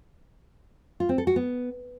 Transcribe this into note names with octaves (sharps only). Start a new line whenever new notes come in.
F4
C4
A4
F#4
B3